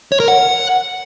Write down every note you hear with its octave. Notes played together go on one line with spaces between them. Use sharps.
C#5
A#4
F#5